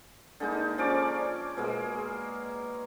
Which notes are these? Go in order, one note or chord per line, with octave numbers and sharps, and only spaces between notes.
D3 G#3 A#3 D#4
F3 C#4 D5 D6
B2 G#3 A#3